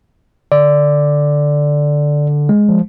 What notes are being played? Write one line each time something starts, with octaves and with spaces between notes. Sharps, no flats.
D3 D5
G#3
F3